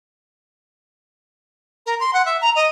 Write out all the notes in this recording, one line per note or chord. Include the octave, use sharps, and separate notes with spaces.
A#4
C6
F#5
E5
A#5
D#5